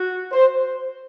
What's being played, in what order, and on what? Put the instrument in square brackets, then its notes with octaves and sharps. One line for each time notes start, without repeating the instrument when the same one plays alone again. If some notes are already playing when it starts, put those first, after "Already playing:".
Already playing: [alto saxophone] F#4
[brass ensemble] C5